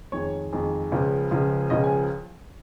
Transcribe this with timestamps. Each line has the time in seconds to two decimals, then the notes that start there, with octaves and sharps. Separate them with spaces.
0.12 F2 D#3 G#3 C#5
0.53 F2 D#3 G#3
0.92 C#2 C#3 F3 G#3
1.31 C#2 C#3 F3 G#3
1.70 C#2 C#3 F3 G#3 D#5
1.84 G#5